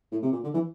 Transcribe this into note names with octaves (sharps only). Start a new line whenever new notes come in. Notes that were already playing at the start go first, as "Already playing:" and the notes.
A2
C3
A#2
D3
E3